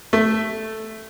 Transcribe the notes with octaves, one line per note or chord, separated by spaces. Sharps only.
A3